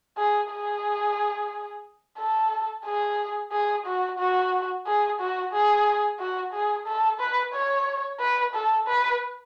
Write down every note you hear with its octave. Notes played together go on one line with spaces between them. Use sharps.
G#4
G#4
A4
G#4
G#4
F#4
F#4
G#4
F#4
G#4
F#4
G#4
A4
B4
C#5
B4
A4
B4